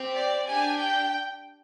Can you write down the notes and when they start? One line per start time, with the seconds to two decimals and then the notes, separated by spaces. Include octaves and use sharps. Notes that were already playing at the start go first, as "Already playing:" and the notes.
Already playing: C4 G4
0.15 D5
0.48 D4 G4 G#5
0.80 G5